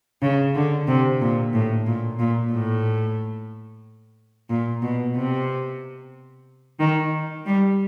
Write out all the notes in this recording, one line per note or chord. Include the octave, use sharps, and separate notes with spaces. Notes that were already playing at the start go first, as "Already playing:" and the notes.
C#3
D3
C3
A#2
A2
A#2
A#2
A2
A#2
B2
C3
D#3
G3